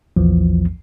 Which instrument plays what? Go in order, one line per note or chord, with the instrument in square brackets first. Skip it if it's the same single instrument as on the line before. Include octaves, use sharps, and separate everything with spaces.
[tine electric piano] A#1 E2 E3 F3